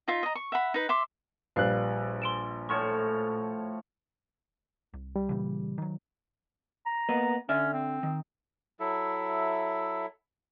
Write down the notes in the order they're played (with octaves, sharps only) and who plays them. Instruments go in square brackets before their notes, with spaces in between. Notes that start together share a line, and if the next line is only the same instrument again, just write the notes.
[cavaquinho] D#4 F4 E5
D#5 A#5
C#6
E5 F#5 B5
D#4 B4
E5 C6 D6
[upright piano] A#1 G3 F#6 [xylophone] B4 F5
[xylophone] C6 D7 E7
[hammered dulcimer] A2 F3 C#5 [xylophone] C#6
[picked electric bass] C2
[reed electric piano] G3
[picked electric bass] A#2 C#3 E3
D#3 F#3
[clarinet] A#5
[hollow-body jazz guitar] A#3 B3 D#5
[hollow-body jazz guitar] D3 D5 E5 [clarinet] C#4
[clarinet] C4
[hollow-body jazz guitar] D#3
[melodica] F#3 E4 A4 E5